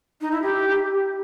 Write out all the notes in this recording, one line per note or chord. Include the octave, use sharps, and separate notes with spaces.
D#4
E4
G4